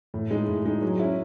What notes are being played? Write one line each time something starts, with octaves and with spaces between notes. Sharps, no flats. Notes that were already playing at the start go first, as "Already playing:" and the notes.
A2
G#3 D#4
A2
G#3 D#4
F#3
C#4 E4